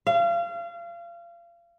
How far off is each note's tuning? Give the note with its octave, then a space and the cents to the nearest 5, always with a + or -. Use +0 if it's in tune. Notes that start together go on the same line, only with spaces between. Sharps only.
F5 -30